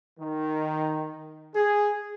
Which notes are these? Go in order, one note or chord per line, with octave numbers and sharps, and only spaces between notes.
D#3
G#4